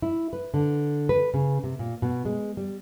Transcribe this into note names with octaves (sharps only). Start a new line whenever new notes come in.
E4
B4
D3
B4
C#3
C3
A#2
B2
G#3
G3